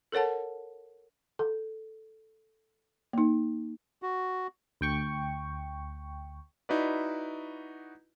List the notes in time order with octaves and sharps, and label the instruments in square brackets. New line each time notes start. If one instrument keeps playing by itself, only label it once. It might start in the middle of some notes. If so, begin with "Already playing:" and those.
[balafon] A4 A#4 C#5 F#5 A5
A4
A#3 D#4
[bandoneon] F#4
[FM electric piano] D2 G5 C#6
[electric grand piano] D#4 E4 F#4 B4 D5